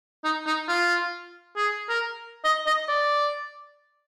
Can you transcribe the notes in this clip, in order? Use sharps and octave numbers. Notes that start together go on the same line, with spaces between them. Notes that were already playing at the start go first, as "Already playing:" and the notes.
D#4
D#4
F4
G#4
A#4
D#5
D#5
D5